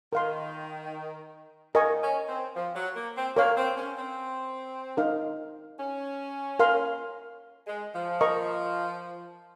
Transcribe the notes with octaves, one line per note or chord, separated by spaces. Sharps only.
D#3 A#4 F5 C6
D#3 A#4 D#5 G#5 C#6
C#4
C4
F3
F#3
A#3
C4
A#3 A#4 C#5 F5
C4
C#4
C4
D#4 A#4 F5
C#4
A#4 F5 C6
G#3
F3
A#4 D#5 A#5 C#6